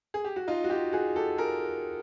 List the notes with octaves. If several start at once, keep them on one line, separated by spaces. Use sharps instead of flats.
G#4
G4
F#4
D#4 F4
F#4
F4 G4
F#4 G#4
G4 A4
G#4 A#4